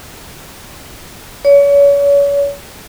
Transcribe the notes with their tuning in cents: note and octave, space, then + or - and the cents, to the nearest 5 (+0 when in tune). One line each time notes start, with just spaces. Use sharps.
C#5 +35